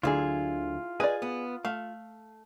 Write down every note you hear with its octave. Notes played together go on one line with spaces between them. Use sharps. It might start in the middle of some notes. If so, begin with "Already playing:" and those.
D2 D3 F#3 E4 F4 G#4
G#4 B4 D5 D#5 G#5
B3
A3 F5